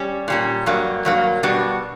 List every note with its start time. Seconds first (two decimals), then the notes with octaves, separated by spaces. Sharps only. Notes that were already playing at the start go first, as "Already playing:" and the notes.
Already playing: G3 C#4
0.28 A#2 G3 C#4
0.66 G2 F#3 A#3
1.05 G2 F#3 A#3
1.43 B2 G3 B3 D4 F#4